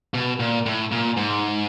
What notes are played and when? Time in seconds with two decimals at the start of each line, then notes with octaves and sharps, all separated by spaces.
0.14 B2
0.40 A#2
0.66 A2
0.92 A#2
1.17 G#2